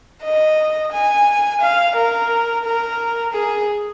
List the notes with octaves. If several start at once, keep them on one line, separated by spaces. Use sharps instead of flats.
D#5
G#5
F5
A#4
A#4
G#4